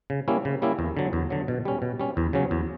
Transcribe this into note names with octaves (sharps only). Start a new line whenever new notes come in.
C#3
G3 A#3 C#4 E4
C#3
G3 A#3 C#4 E4
E2
D3 F#3
E2
D3 F#3
B2
G3 C#4
B2
G3 C#4
E2
C#3 F#3 C#4
E2